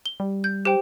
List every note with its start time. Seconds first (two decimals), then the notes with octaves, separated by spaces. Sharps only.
0.06 G7
0.20 G3
0.44 G6
0.65 G4 C5 G5